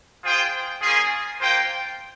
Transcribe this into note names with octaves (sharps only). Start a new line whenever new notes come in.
F4 G#4 C5 G5
A#3 C#4 F4 G#4
A#3 F4 C5 G5